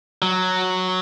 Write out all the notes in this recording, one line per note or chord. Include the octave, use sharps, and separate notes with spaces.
F#3